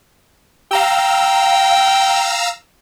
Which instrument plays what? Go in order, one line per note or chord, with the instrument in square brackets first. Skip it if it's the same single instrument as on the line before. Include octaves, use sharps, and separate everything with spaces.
[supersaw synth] F5 A#5 E6 [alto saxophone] G5